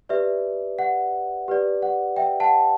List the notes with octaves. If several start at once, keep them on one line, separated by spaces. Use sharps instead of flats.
G4 B4 D5 E5
F#5
G4 B4 D5
F#5
E5 G5
F#5 A5